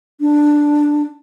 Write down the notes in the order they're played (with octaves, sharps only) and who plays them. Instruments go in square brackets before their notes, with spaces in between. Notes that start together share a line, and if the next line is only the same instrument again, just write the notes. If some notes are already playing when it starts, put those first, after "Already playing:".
[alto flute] D4